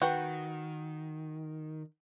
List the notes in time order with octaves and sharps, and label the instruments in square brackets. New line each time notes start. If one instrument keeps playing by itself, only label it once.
[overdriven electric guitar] D#3 [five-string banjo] F#4 [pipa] B4 G5